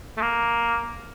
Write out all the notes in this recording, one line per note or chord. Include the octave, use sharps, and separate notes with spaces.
A3
A#3